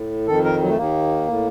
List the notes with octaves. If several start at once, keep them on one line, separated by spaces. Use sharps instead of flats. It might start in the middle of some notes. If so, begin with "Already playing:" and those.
Already playing: A2
F2 D#3 A4
A#4
F#3
A3
D#2 D#3 A#3
A2